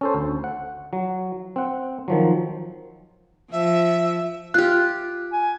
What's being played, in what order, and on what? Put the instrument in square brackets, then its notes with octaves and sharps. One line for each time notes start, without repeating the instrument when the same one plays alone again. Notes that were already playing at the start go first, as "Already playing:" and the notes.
[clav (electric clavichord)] C#4 A4 C5
D2
F#5
F#3
C4 F#5
D#3 F3 F#3
[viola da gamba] F3 [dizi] E5
[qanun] F4 G4 [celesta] F#6
[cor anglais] G#5